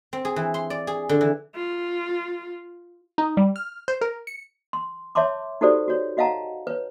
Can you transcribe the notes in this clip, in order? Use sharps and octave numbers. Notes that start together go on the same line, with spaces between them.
C4
G#4
E3
C6
D5
G#4
D3
E3
F4
D#4
G3
F6
C5
A#4
C#7
C6
C#5 E5 A5 C6 D6
D#4 F#4 G4 A4 C5 D5
F#4 C#5
F#4 D#5 F5 F#5 A5 A#5
B4 C#5